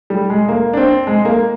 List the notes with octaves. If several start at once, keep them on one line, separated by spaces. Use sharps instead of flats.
G3
G#3
A#3
D4
C4
G#3
A#3